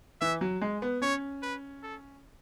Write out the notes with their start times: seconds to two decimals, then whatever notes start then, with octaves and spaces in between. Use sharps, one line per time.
0.21 E3 E5
0.41 F#3
0.61 G#3
0.82 B3
1.02 C#4 C#5
1.42 B4
1.83 A4